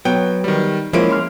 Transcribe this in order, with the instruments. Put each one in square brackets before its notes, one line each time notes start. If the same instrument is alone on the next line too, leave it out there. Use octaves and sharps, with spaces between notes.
[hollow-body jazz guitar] F#3 B3 [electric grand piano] G5
[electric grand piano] D#3 G3
[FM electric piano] F3 C5 [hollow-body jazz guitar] G#3 A#3 C#4 [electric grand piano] E4 D7
[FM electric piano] C6 F6